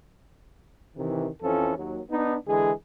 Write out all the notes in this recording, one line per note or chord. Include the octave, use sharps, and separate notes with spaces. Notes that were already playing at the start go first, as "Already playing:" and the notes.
C3 D#3 E3
F2 E3 F3 C#4 A4
D#2 F#3
B3 D4 D#4
D3 E3 G#3 G#4